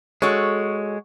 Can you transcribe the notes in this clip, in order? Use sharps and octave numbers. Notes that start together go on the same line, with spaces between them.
G#3 F#4 A4 C#5